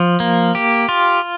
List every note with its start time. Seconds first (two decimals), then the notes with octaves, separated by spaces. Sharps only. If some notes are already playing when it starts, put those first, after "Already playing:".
Already playing: F3
0.20 A#3
0.55 G4
0.89 F4